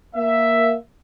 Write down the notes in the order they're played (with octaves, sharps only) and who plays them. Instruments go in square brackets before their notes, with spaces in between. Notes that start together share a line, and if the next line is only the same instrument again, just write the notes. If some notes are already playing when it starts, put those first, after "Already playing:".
[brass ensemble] A#3 E5